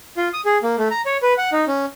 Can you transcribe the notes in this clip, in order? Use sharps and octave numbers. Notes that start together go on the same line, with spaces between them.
F4
D#6
G#4
A#3
A3
A#5
C#5
B4
F#5
D#4
C#4